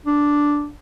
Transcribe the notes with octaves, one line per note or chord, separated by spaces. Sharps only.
D4